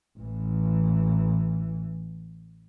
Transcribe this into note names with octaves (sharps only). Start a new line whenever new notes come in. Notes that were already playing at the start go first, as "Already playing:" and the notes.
A1 E3